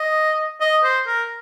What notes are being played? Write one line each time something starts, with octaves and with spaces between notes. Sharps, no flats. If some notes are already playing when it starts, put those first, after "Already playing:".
Already playing: D#5
D#5
C5
A#4